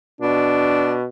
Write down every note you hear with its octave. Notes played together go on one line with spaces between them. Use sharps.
B2 D4